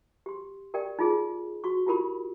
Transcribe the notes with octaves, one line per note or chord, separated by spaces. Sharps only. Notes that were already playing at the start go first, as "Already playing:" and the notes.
G4 C6
G4 A#4 D5 G5
D#4 F4 G#4
F#4 C#6
E4 F4 G4 A#4 B5